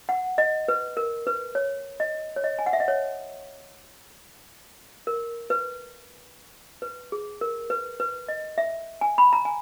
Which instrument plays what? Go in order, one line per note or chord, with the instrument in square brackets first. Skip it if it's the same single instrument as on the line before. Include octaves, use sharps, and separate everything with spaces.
[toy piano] F#5
D#5
B4
A#4
B4
C#5
D#5
C#5
D#5
G#5
F#5
E5
D#5
C#5
A#4
B4
B4
G#4
A#4
B4
B4
D#5
E5
G#5
B5
A#5
G#5